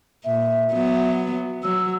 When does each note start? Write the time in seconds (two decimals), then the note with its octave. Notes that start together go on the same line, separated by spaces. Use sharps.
0.25 A#2 E5
0.72 F#3 B3
1.63 F#3 E6